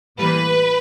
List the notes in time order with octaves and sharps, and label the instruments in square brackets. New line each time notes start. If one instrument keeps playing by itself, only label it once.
[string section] A2 E3 G3 A#3 B4